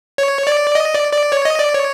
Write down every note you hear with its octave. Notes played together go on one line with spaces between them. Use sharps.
C#5
D5
D#5
D5
D5
C#5
D#5
D5
C#5